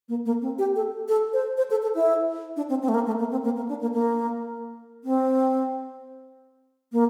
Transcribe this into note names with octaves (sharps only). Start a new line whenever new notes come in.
A#3
A#3
C4
G4
A4
A4
C5
C5
A4
A4
E4
D4
C4
C4
A3
A#3
A3
A#3
C4
A#3
A#3
D4
A#3
A#3
C4
A#3